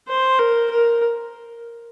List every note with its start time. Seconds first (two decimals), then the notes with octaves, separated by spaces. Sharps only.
0.08 C5
0.39 A#4
0.71 A#4